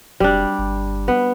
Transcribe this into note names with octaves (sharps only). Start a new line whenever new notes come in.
F1 G3 D4
G1
B3